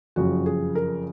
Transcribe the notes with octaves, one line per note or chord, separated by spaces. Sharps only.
F#1 F2 C#3 F#4
G#4
A#4